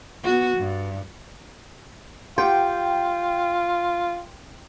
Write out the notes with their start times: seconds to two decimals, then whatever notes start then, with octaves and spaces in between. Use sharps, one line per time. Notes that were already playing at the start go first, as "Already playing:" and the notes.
0.23 B3 F#4
0.57 G2
2.38 F4 G4 F#5 G5 C6